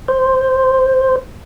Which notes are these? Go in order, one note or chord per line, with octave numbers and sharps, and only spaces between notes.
C5